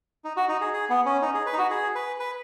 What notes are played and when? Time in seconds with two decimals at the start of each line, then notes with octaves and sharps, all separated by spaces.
0.24 D#4
0.37 F#4
0.49 D#4
0.61 G#4
0.74 G#4
0.89 B3
1.06 C#4
1.22 D#4
1.34 G#4
1.46 B4
1.53 D#4
1.58 F#4
1.71 G#4
1.95 B4
2.20 B4